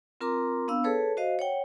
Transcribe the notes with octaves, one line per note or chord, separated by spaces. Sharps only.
C4 F4 A#4 A#5 C6 D6
B3 D4 F5 E6
G#4 A4 B4 C#5 A5
F#4 C5 D#5 F5
C#5 F#5 G5